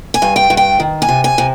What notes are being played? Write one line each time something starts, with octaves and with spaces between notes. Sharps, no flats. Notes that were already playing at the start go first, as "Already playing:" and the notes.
G#5
G2
G5
G2
G5
D#3
G#5
C3
G#5
C3